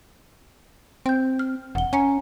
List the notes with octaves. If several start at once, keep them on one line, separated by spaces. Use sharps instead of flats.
C4 G5 G6
F6
E1 F#5 G7
C#4 G#5 A#5 C#7